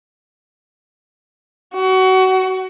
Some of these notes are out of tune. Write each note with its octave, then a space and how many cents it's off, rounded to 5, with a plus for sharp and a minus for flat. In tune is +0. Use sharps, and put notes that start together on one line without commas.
F#4 +25